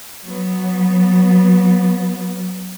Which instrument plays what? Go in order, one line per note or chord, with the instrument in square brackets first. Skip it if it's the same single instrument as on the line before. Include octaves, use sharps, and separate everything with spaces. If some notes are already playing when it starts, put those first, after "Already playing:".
[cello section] F#3 B3